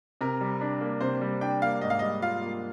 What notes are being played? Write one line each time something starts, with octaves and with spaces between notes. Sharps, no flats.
C3 A#4
G3
D4
A#3
C3 C5
G3
D4 G5
A#3 F5
G#2 D#5
F5
G3 D#5
F4 F5
A#3